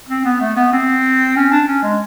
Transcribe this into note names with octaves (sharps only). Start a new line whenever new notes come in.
C4
B3
A3
B3
C4
C#4
D4
C#4
G#3